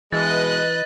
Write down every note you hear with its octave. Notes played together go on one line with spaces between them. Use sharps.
B2 E3 G#3 B4 D#5 F#6 A6